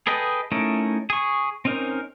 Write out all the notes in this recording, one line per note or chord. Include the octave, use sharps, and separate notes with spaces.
G#4 A4 B4 D#5 G5
A3 C#4 D#4 E4 A#4
G#4 C#6
C4 C#4 D#4 A#4 C5